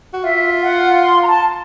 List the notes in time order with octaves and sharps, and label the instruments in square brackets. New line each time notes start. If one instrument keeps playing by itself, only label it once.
[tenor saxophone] F#4
[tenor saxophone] F4 [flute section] E5
[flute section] F#5
C6
A#5
A5